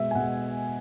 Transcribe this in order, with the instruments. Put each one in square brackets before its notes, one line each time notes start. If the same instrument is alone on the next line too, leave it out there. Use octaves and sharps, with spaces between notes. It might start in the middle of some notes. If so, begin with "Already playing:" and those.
Already playing: [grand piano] B2 G#3 E5
G#5
B2 G#3 F#5